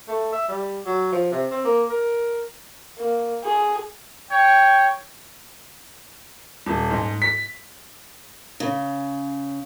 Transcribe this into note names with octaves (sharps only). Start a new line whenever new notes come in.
A3
E5
G3
F#3
F3
C3
C4
A#3
A#4
A#3
G#4
C#5 G5
D#1
G#2
B6
C#3